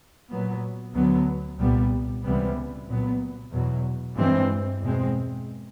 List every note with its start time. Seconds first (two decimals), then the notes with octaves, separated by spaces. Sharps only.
0.30 A#2 F#3 B3
0.94 D2 D3 F#3 B3
1.59 C2 A#2 G3 B3
2.23 C#2 C3 E3 G3 B3
2.87 C2 A#2 F#3 B3
3.52 E2 B2 F#3
4.16 G2 E3 G#3 C4
4.80 E2 B2 G#3 C4